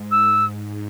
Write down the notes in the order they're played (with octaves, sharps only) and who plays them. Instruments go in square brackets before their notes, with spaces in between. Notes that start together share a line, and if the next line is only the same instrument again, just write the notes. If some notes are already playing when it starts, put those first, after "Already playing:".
Already playing: [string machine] G#2
[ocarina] E6